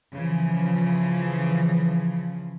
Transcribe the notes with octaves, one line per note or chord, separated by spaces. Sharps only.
C#3 E3 F3